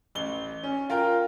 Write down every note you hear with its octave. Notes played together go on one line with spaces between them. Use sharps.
A1 G7
C#4
F4 A#4 G5